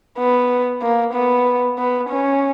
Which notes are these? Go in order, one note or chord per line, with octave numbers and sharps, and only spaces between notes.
B3
A#3
B3
B3
C#4